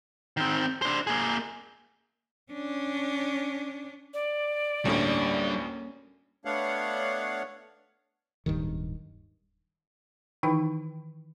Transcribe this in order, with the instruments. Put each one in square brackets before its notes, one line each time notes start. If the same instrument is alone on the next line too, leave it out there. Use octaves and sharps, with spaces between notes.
[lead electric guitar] D#3 C4
D4 C5
A#3 G#4
[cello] C#4 D4
[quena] D5
[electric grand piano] D2 A2 [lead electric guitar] G3 D4 [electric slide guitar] A#3 C#4
[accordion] A3 B3 D4 C#5 F5 F#5
[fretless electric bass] D1 G2 D#3
[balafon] D#3 E3 D#4 E4 G5